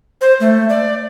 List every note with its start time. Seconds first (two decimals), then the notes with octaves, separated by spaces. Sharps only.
0.21 C5
0.40 A3
0.69 D5